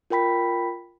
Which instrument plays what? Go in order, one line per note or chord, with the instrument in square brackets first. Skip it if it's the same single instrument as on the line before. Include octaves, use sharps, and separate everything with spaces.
[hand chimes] F4 A#4 G5 B5 B6